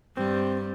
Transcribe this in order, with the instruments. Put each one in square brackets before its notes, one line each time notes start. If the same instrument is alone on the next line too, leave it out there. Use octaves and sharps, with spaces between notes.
[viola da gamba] G2 G3 [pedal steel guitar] C4